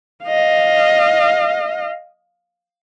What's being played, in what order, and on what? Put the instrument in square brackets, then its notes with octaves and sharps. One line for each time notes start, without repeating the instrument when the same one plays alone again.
[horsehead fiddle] D#5 F5